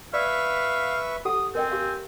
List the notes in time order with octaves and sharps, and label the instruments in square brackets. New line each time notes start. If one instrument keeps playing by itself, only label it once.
[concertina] B4 E5 C#6 [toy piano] D5 E6 [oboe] F5
[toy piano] G4 A4 F#5 [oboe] D#6
[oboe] C4 [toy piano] A#4 D#5 G5 [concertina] G#5
[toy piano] G4 F5